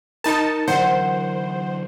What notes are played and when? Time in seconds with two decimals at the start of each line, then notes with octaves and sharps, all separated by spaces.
0.24 D#4 A#4 A5 B5 C#7
0.68 D3 E3 F#3 C5 F#5